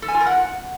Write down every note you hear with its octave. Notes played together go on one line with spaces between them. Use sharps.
A4
G#5
F4
A#4
F#5